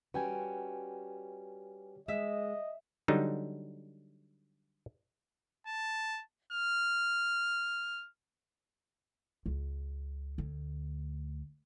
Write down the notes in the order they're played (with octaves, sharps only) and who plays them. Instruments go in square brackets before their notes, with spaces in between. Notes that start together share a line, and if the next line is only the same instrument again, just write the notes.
[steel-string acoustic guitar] G3 C#4 F#4 [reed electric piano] B4 G5 G#5
[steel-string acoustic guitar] G#3 [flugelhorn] D#5 [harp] E5
[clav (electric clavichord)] D3 F#3 G3 D#4
[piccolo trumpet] A5
F6
[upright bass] C#2
D2